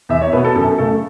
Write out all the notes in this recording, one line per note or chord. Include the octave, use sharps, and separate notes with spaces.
E2 E5
C#5
B2 B3 B4
A4
F#2 A4
C#3 A3 A4